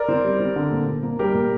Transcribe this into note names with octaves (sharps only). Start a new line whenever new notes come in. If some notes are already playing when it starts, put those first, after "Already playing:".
Already playing: A#4 D5
C4
G3
C4
D3
A#2
A#2
A#3
G3 G4 A#4
A#2